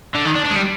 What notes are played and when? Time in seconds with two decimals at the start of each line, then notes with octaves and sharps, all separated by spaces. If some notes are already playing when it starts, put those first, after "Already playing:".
0.15 D3
0.25 D#3
0.36 D4
0.46 D4
0.51 G#3
0.56 G3